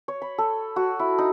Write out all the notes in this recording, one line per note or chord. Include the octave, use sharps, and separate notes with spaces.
C#5
B5
A4
F#4
E4
D#4